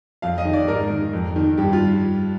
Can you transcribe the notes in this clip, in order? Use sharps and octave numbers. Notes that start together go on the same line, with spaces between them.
F2 F5
D#5
D#3
D5
G#2 A#4
D#3
F2
D#3
G2 G4
F4